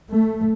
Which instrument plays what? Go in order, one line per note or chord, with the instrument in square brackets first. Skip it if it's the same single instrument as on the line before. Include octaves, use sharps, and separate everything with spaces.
[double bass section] A3